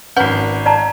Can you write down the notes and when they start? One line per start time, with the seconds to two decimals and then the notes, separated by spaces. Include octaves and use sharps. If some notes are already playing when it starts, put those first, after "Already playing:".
0.16 G#1 C#4 B4 F#5 G6
0.66 D5 A5 A#5